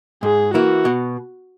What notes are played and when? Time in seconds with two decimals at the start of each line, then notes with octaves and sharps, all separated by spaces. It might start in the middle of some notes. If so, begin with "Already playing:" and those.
0.23 G#2 G#4
0.54 E3 A#3 E4 F#4
0.85 B2